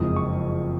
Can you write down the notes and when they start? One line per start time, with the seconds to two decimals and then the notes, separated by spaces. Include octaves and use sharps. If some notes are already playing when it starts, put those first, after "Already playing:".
Already playing: F#1 F2 F3 G#3 D#6
0.16 C#6